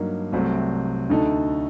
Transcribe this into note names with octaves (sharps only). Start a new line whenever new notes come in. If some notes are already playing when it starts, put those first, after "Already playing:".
Already playing: G2 F#3 A#3 D#4
C2 C3 F#3 A3 C4
D2 D3 A3 D#4 A4